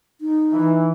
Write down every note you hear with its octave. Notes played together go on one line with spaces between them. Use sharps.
D#4
E3